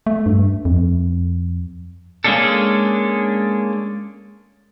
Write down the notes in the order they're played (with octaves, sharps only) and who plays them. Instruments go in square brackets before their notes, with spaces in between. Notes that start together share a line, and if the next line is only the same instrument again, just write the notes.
[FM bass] A3
G2
F2
[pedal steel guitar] G#3 A#3 C#4 D4 A4